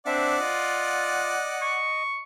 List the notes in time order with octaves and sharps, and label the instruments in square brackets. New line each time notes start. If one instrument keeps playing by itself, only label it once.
[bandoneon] C4 D4 E5 [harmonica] D5 F#5
[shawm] F4 [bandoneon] D#5
[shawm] C#6